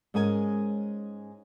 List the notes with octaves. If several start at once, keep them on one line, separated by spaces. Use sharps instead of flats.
G#2 G#3 C#4 A#4 G#5